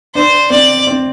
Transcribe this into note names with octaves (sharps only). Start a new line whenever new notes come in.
D4 C5
C4 D5
C4